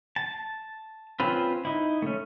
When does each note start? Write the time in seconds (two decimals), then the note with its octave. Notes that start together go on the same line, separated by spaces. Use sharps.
0.16 A5
1.20 C4 C#4 F4 B4
1.65 D#4 E4
2.02 A3 C#4